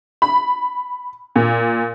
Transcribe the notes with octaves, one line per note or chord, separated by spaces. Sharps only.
B5
A#2